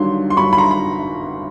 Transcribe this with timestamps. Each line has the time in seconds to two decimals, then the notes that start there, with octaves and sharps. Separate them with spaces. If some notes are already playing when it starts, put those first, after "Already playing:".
Already playing: G1 G2 D#3 F#3 C6
0.30 C6
0.37 G1 G2 D#3 F#3 B5 C#6
0.53 B5
0.58 A#5 C6
0.71 B5